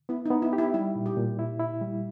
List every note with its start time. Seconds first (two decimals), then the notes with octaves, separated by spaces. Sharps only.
0.09 B3 E4
0.26 D#4
0.30 B3
0.42 E4
0.53 G4
0.58 E4
0.74 G3 E4
0.95 A#2
1.06 G4
1.17 A#2
1.39 E4
1.60 E4
1.81 G3